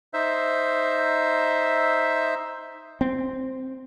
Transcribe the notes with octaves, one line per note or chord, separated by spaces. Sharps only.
D#4 C5 E5
C4